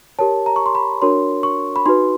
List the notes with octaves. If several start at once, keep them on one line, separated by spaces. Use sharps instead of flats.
G4 A#4 C#5 A5
A#5
C#6
C6
B5
D4 F#4 A#4 C#5 C6
C#6
B5
D#4 F#4 B4 C6